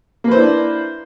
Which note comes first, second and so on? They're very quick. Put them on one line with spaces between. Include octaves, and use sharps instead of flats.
A#3 B4 C5 E4 D4